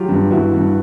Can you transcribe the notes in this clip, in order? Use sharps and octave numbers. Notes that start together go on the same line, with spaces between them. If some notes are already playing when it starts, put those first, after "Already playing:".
Already playing: F#3 F4 G4
G2
G2 E4 F#4
G2